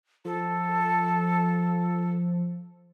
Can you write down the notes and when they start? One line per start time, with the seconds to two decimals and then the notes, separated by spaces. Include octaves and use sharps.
0.25 F3 A4